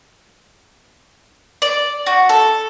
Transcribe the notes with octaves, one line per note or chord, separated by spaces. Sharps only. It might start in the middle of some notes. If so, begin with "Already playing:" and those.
D5
F#4
A4